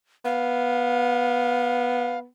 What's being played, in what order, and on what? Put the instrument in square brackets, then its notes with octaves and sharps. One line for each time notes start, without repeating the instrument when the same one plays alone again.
[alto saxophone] B3 [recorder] F5